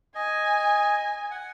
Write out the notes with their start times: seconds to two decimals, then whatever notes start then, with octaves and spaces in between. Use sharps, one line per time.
0.15 D#5 G#5
1.31 F#5